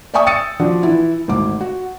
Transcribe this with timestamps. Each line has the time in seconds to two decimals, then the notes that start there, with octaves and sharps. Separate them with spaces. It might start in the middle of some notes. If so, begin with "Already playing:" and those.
0.14 D5 E5 G5 G#5 C#6 D#6
0.26 G5 D#6 E6 A6 C#7 D#7
0.60 F3 D4 F#4
0.83 E3 E4
1.28 G#1 D2 D6
1.61 F#4